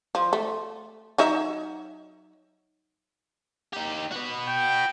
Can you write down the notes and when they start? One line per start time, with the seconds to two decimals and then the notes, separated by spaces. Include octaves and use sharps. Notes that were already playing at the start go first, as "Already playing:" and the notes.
0.15 F3
0.33 A3
1.18 F#3 D#4 E5
3.73 D#4 G4
4.12 F#4 B4
4.47 G5